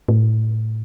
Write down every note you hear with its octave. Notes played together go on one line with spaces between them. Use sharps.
A2